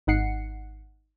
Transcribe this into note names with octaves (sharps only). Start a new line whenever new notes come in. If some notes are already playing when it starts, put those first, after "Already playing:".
G#1 D#4 F#5 C7 C#7